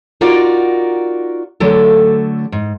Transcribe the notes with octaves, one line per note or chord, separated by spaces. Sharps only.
D#4 F4 F#4 A#4 D5
D3 F#3 A3 A4
G#2